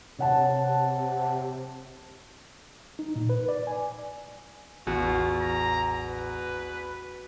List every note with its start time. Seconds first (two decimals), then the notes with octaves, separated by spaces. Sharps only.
0.19 C3 C#5 F#5 A5
2.99 D#4
3.16 A#2
3.29 B4
3.48 D5
3.67 G#5
4.87 A1 E2 F4 F#4
5.41 A#5
6.08 B4